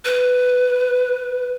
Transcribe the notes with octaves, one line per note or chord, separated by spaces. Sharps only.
B4